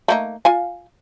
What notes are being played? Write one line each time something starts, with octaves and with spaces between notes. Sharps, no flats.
A3 A#3 D#4
F4 F5 G#5